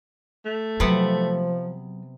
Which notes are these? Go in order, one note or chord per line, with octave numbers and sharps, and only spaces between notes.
A3
C3 F3 F#3 B3 F#5